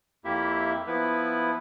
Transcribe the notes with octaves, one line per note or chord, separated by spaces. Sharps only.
F2 A#3 E4 G4 E5
F3 B3 E4 B4